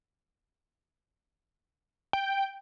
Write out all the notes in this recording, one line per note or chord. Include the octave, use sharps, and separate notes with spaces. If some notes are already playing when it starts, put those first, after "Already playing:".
G5